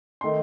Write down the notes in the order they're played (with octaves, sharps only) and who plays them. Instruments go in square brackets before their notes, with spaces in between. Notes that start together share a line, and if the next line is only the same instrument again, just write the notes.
[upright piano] D#3 A3 D#4 C6